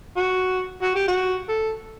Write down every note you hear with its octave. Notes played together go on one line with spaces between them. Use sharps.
F#4
F#4
G4
F#4
A4